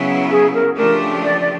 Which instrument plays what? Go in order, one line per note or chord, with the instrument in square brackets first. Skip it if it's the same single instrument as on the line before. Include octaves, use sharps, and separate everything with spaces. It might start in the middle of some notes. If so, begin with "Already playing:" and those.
Already playing: [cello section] C#3 F#3 B3 E4
[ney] G#4
A#4
[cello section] C#3 F3 A3 D4 G4 [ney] A#4
[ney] D5
D5